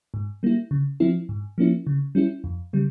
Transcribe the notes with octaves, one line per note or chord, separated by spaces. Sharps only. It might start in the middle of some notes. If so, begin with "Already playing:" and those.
G#2
G3 A#3 E4
C#3
F3 C4 E4
G#2
F3 A#3 C#4 E4
C#3
G3 C#4 E4
F2
C#3 G3